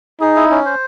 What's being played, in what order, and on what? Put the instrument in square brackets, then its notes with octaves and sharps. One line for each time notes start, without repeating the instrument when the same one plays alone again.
[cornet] D#4 [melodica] G#4
[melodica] E4
C#4
C5